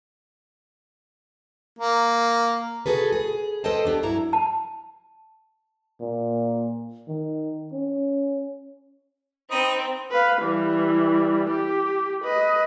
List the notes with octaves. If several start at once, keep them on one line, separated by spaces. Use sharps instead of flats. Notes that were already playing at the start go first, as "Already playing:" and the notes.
A#3
F#4 G#4 A4 B4
G#4
A4 B4 C5 D#5 G5 A5
B3 D4 G4
G2 F#3 E4 A#5
A5
A#2
D#3
C#4
C4 D#4 B5 D#6
B4 F5
E3 G3
G4
B4 D#5